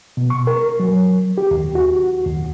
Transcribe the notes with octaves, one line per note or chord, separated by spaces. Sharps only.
B2
C#6
A#4
F#3
G4
D#2
F#4
D#2